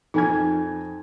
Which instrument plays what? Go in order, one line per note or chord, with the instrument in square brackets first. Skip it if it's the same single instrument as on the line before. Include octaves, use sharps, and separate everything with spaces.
[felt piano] F2 G#5 G#6 [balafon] D#4